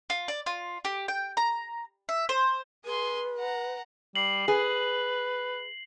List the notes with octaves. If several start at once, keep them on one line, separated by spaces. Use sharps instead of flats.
F4
D5
F4
G4
G5
A#5
E5
C5
G#4 B4 C6
F#5 A#5
G3 C7 F#7
G#4 B4